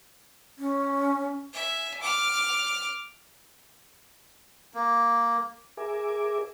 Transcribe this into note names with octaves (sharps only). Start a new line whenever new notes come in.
C#4
E5 G#5
D6 F6
A#3
G#4 A#4 E5 G#5 D6